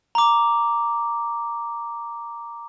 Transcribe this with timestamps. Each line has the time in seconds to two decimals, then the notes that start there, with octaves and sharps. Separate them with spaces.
0.15 A#5 D6